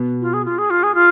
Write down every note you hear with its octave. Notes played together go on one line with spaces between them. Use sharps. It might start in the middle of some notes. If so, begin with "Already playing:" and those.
Already playing: B2 B3
F4
G#4
F4
G#4
F4
G#4
F4